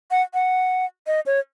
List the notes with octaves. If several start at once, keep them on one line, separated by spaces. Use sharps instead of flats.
F#5
F#5
D#5
C#5